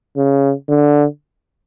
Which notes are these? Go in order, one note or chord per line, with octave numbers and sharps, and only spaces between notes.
C#3
D3